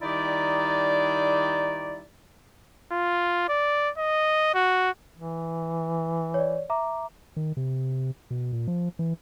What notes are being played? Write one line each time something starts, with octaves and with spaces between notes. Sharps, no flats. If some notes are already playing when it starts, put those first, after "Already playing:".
D#3 G3 D#4 E4 G4 D5
F4
D5
D#5
F#4
E3
C#5 D5
E5 A#5 D6
D#3
C3
B2
A#2
F3
E3